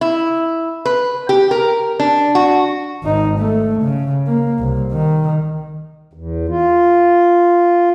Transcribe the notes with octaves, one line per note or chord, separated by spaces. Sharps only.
E4
B4
G4
A#4
D4
F#4
G#1 D#4
A3
C#3
A#3
C2
D#3
E2
F4